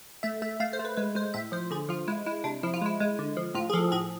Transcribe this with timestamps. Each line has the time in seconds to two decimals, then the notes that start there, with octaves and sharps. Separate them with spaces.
0.23 A3 E5
0.42 A3 E5
0.60 A3 F5
0.73 C5
0.79 A3
0.85 B4
0.97 G#3 B4
1.15 G#3 C5
1.34 A2 E5
1.52 F3 C5
1.71 D3 G#4
1.89 F3 F4
2.08 G#3 E4
2.26 G#3 E4
2.44 C3 D4
2.63 F3 E4
2.74 F4
2.82 G#3 E4
3.00 G#3
3.19 D3
3.37 F3
3.55 A2 F4
3.70 G#4
3.73 F3 A4
3.92 A2 G#4